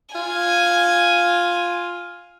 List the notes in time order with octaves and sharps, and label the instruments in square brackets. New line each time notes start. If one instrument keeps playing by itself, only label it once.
[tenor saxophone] F4 [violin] G#5